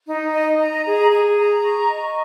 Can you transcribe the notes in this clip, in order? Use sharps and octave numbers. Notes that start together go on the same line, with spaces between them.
D#4
D#5
A#5
G#4
G#4
A#5
C#6
D#5